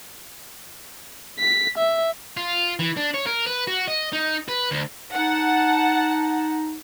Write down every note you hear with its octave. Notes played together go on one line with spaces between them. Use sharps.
B6
E5
F4
E3
D4
C#5
A#4
B4
F#4
D#5
D#4
B4
D2
D#4 F#5 A5